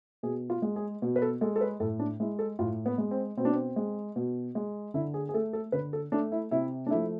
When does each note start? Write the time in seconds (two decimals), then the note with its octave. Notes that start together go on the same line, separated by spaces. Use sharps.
0.23 B2 G#4
0.50 F4
0.62 G#3
0.76 G#4
1.02 B2
1.16 B4
1.22 A4
1.41 G#3 A4
1.56 A4
1.61 B4
1.80 A2 A4
1.99 D4
2.20 G#3 E4
2.39 A4
2.59 A2 F4
2.86 B3
2.98 G#3
3.11 C4
3.37 B2 C4
3.45 D4
3.53 C4
3.76 G#3
4.16 B2
4.55 G#3
4.94 D3 E4
5.14 G#4
5.29 G#4
5.34 A3 A4
5.53 A4
5.72 D3 B4
5.93 A4
6.12 A3 D4
6.32 E4
6.51 C3 E4
6.87 D4
6.90 F3 A3 E4